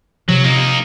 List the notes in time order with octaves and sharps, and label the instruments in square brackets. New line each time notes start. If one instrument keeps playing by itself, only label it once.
[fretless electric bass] C3 F3 [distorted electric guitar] F#3
[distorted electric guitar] A#3 D#4